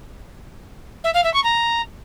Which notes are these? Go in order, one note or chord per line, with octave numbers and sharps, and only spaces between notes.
E5
F5
E5
C#6
A#5